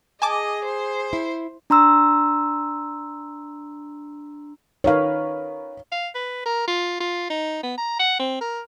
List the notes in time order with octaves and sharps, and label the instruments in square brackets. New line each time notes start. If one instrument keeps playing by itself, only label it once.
[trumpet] G#4 [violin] D#5 [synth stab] G#5 A5 D6
[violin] C5
[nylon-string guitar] E4
[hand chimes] D4 A#5 C6 E6
[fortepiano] D#3 A#4 B4 [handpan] C#5 F5
[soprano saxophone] F5
B4
A#4
F4
F4
D#4
B3
A#5
F#5
C4
A#4